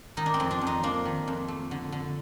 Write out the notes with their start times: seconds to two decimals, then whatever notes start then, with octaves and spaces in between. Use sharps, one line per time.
0.17 D#3 D#4
0.26 D4
0.34 C4
0.40 F2
0.51 D4
0.61 F2
0.67 D#4
0.83 A#3 D4
1.05 D#3
1.28 F2
1.48 A3
1.71 D3
1.92 D3